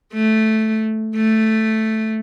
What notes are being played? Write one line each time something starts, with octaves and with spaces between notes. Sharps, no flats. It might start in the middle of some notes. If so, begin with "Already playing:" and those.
A3
A3